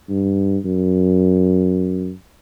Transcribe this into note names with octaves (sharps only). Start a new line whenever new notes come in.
G2
F#2